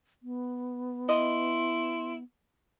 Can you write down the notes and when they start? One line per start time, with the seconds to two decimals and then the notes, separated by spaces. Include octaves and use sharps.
0.23 B3
1.09 E4 D#5 C6